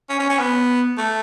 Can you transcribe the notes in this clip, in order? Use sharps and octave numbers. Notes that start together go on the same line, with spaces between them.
C#4
C#4
C#4
B3
A3